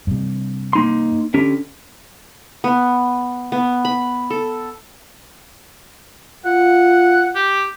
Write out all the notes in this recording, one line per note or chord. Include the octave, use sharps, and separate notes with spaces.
G2 C3
A#3 D#4 C6
D3 C#4 G4
B3
B3
B5
A4
F4 F#5
G4